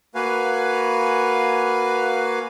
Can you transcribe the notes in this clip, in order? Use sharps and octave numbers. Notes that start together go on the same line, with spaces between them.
A#3 F#4 B4 F5 G#5